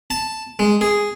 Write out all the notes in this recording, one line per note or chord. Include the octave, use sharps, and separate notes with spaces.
A5
G#3
G#4